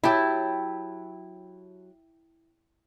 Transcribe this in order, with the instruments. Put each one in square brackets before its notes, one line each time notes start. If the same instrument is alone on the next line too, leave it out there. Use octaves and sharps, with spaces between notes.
[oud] F#3 G4 [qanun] E4 [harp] G5 A5 B5